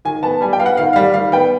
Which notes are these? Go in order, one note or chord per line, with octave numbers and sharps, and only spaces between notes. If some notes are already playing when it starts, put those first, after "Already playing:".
D#3 G#5
B3 A5
G3 G#5
G5
B3 F5
F#5
D#3 F5
G3 F5
D#3 F5
B3 G5